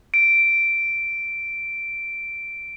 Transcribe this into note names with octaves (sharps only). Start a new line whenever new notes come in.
D7